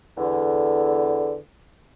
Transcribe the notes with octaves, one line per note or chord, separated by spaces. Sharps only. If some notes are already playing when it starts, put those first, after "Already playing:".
E2 D3